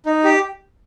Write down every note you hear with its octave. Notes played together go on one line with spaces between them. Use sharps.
D#4
G4